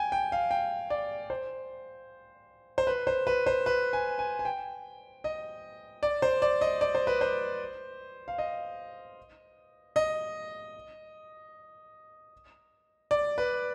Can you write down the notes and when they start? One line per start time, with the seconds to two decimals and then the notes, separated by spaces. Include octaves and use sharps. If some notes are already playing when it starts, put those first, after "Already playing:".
Already playing: G5 G#5
0.12 G5
0.32 F5
0.51 G5
0.90 D5
1.30 C5
2.78 C5
2.87 B4
3.07 C5
3.27 B4
3.46 C5
3.66 B4
3.93 G#5
4.19 G#5
4.39 G#5
4.45 G5
5.24 D#5
6.03 D5
6.22 C5
6.42 D5
6.61 D#5
6.81 D5
6.95 C5
7.07 B4
7.21 C5
8.28 F5
8.38 D#5
9.96 D#5
13.11 D5
13.38 B4